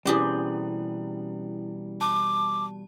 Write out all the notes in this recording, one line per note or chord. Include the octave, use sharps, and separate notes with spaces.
B2 E3 G3 C4 C#4 E4 G4 G#4
A5 D6